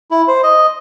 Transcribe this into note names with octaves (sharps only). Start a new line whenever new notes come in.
E4
C5
D#5